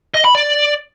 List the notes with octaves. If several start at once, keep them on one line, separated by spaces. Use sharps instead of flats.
D#5
B5
D5